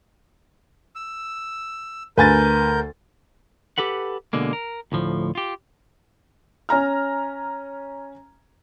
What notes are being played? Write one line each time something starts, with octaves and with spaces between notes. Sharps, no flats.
E6
D2 A#4 B4 G#5 G6 A6
G4 A4 B4 F#5
B2 D3 G#3 A#3
A#4
D2 A2 F3
F4 G4
C#4 G#5 A#5 F6